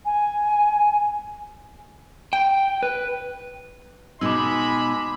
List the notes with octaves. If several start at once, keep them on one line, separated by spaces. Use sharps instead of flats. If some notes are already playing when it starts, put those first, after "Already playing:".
G#5
G5
B4
B2 G#3 D#4 G#5 B5 D6 E6